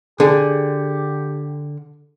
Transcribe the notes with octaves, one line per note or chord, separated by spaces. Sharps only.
D3 G4 G#4